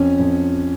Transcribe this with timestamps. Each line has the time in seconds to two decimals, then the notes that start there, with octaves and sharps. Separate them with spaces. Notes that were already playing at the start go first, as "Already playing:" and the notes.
Already playing: F2 C#4
0.19 F2